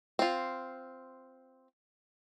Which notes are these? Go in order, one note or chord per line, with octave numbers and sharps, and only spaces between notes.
C4 F4